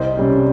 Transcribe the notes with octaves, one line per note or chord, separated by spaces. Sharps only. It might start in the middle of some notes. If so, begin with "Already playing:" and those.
Already playing: C2 C5 D#5
C3 G3 C#4